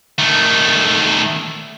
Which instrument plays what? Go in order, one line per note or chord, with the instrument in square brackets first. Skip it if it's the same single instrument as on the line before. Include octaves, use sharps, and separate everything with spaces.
[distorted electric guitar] D#3 A3